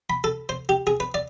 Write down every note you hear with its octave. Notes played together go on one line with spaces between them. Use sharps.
B5
A4
C5
G4
G#4
B4
D5